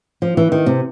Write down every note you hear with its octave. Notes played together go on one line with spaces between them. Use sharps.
F3
E3
D#3
C3